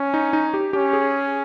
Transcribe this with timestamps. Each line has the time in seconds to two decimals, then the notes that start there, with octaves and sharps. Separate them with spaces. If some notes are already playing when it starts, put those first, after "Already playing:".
Already playing: C#4
0.14 D#4
0.33 D#4
0.54 G4
0.73 C#4 G4
0.93 G#4